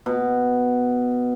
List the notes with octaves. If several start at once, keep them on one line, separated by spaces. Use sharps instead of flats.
B2